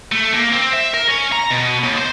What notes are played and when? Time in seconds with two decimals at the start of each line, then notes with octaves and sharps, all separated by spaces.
0.12 A3
0.34 A#3
0.52 C4
0.73 E5
0.94 A#4
1.08 C#4
1.32 A#5
1.51 B2
1.84 D#2
1.98 C5